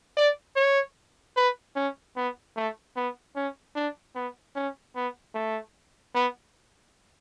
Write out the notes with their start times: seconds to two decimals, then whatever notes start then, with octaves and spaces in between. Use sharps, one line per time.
0.17 D5
0.56 C#5
1.36 B4
1.76 C#4
2.16 B3
2.56 A3
2.96 B3
3.36 C#4
3.76 D4
4.15 B3
4.56 C#4
4.96 B3
5.35 A3
6.15 B3